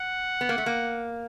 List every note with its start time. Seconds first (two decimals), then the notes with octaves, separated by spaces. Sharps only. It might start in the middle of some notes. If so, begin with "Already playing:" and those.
Already playing: F#5
0.41 B3
0.49 A#3
0.58 A3
0.66 A#3